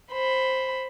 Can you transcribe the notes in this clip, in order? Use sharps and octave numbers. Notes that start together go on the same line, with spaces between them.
C5 B5